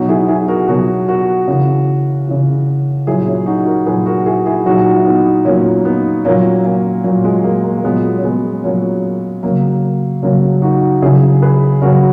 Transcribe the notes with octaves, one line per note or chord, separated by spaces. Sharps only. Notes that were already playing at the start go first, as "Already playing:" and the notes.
Already playing: B2 F#3 D#4 F#4
E4 G#4
E4 G#4
F#4 A#4
B2 F#3 F#4 A#4
F#4 A#4
C#3 E3
C#3 E3
A#2 F#3 E4 G#4
C#4 E4
D#4 F#4
F#4 A#4
A#2 F#3 G#4 B4
F#4 A#4
E4 G#4
E4 G#4
A#2 F#3 D#4 F#4
E4
B3 D#4
A#2 F#3 A#3 C#4
B3 D#4
A#2 F#3 A#3 C#4
A#3 C#4
A#2 F#3 A#3
G#3
A#3
A#3
A#3
A#2 F#3 G#3 B3
C#4
G#3 B3
A#2 F#3 A#3 C#4
C#3 F#3 A#3
C#3 F#3 A#3
D#4 F#4
C#3 F#3 E4 G#4
G#4 B4
C#3 F#3 F#4 A#4